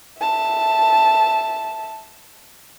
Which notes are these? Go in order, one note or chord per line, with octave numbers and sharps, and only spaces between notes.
E5 A5